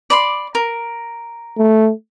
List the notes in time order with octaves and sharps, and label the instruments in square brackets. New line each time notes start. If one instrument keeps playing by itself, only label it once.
[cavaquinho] D5 B5 C6
A#4
[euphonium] A3